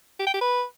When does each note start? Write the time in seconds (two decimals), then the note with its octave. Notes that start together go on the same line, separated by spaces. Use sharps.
0.19 G4
0.27 G5
0.34 G4
0.41 B4